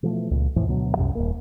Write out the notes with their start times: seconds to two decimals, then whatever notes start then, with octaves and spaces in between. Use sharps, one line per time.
0.03 B2 E3 F3 A3
0.31 C#2 A#2
0.56 F2 A2 E3 F3
0.68 D2 B2 F#3
0.97 C2 F#2 C3
1.15 D#1 B1 A#3